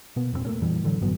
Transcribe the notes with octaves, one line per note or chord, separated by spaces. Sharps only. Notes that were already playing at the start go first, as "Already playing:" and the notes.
B2 A#3 B3
E1 G2 A#2 C4
A3 A#3 C#4
F2 A#2 E3 G3
A2 D3 E3 F#3
G#1 G2 F#3 B3